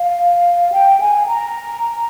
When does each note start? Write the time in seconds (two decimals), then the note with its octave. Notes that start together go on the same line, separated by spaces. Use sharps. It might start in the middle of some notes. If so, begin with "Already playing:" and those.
Already playing: F5
0.72 G5
1.00 G#5
1.28 A#5